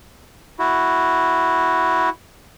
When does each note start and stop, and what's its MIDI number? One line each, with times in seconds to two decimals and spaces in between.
0.59 2.09 64
0.59 2.09 66